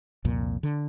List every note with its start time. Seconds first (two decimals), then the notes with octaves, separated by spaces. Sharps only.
0.24 C2 F2 A#2
0.63 D3